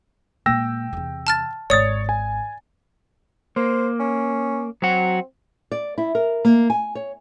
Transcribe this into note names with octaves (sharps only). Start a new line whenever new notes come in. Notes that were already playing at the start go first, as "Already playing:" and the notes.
A#2 G#3 G5 E6 A#6
E2 C3
A5 F6 A6
G#1 C#5 D5 D#6 A6
G#5
A#3 C5
C#4
F#3 C4 F#4
D5
E4
A#4
A#3
G#5
C#5